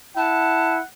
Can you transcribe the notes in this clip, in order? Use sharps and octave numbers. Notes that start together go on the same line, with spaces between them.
E4 F#5 A5